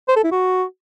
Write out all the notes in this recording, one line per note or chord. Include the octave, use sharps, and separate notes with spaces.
C5
A4
E4
F#4